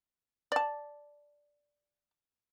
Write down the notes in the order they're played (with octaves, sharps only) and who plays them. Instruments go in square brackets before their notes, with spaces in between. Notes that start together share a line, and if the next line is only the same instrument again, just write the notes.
[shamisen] D5 A5